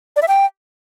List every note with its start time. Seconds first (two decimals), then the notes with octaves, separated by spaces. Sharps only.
0.16 D5
0.22 E5
0.28 G5